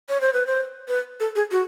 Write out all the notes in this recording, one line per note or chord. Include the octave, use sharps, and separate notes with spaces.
C#5
C5
B4
C5
B4
A4
G#4
F#4